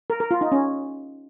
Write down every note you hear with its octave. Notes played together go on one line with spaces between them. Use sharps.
A#4
A#4
F4
D#4
C#4